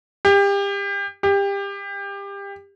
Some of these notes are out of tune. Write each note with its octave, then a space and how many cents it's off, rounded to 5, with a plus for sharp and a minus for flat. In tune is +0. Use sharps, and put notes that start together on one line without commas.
G4 +30
G4 +25